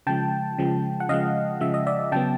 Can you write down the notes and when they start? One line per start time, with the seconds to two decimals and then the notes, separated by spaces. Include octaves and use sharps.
0.07 C#3 F3 G#3 G5 A5
0.58 C#3 F3 G#3
1.00 F#5
1.09 C#3 F3 G#3 D#5 F5
1.61 C#3 F3 G#3 E5
1.74 D#5
1.87 D5 E5
2.12 C#3 F#3 B3 G5 A5